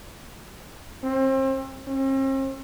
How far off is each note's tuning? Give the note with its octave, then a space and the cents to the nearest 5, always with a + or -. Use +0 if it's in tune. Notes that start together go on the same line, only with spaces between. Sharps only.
C4 +35
C4 +45